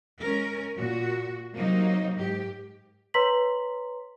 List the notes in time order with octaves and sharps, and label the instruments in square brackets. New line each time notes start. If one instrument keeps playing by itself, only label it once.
[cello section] G#3 C#4 A#4
A#2 F#4
C3 F#3 A#3 D#4
G#2 G4
[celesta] B4 C#5 A#5 C6 B6 F#7